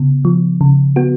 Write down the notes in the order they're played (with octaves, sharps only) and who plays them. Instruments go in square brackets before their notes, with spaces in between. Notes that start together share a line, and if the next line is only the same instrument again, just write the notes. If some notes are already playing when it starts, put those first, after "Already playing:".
Already playing: [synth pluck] C#3 B3
F3
C#3
B3 F#4